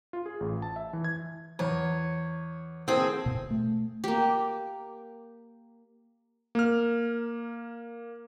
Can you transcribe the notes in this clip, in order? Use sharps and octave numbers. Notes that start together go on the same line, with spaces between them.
F4
G#4
A1
A5
E5
E3
G#6
E2 C#5
E3 A#3 C4 G#4 A4
B2
A3
A#3 G4
A#3 F6